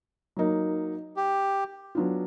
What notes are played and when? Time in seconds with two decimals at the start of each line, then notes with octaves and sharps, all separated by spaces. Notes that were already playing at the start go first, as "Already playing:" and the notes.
0.37 F#3 A#3 D#4
1.16 G4
1.95 F#3 B3 D4 F4